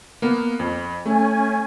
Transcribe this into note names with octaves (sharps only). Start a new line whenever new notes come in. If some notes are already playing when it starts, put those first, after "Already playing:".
A#3 B3
F2
A3 C#4 G#5